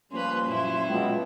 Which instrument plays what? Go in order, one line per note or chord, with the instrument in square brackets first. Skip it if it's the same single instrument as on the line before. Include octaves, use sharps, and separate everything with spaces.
[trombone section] F3 G3 C#4 [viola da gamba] A#3 B4 [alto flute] C6
[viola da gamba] F#2 A#2 E4
[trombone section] B2 F#3 B3 [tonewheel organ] G#3 F4 [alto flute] G5